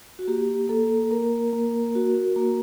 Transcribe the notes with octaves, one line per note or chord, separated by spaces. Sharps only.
F#4
A#3 G4
A#3 A4
A#3 A#4
A#3
F#4
A#3